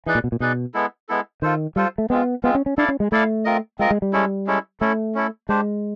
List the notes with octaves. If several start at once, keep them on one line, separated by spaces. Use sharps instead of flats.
E3 D#4 G#4 B4 D5
A#2
B2
A#2
B2 D#4 G#4 B4 D5
G#3 B3 E4 A4
G#3 B3 E4 A4
D#3 F4 A4 C5
G3 F4 A4 C5
A3
G#3 B3 C4 F4
G#3 B3 C4 F4
C#4
C#4
D4 E4 A4 D5 F5
C#4
G#3
A3 E4 A4 D5 F5
C4 F4 A#4 D#5
G#3 C4 F4 A#4 D#5
G#3
G3
G#3 C#4 E4 A4
G#3 C#4 E4 A4
A3 C#4 E4 A4
C#4 E4 A4
G#3 D4 G4 C5